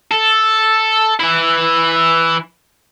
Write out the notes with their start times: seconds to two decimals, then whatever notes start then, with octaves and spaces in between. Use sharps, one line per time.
0.11 A4
1.20 E3 E4